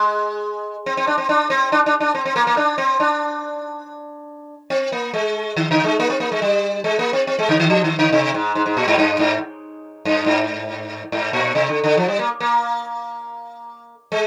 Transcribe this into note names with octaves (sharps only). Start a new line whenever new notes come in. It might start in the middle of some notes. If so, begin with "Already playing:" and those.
Already playing: G#3
C4
C4
D4
C4
D4
C4
D4
D4
D4
C4
C4
A#3
A#3
D4
C4
D4
C4
A#3
G#3
D#3
D3
G#3
A#3
C4
A#3
G#3
G3
G#3
A#3
C4
C4
G#3
D3
D#3
F3
D#3
D3
C3
G#2
G#2
G#2
A#2
G#2
G2
G#2
G2
G#2
G#2
A#2
C3
D3
D3
F3
G3
A#3
A#3
G#3